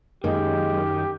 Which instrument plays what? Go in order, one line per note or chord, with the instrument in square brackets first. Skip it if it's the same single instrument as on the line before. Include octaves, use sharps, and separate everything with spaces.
[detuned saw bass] F#2 [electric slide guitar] D#3 [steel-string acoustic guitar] G#3 A#3 [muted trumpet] G4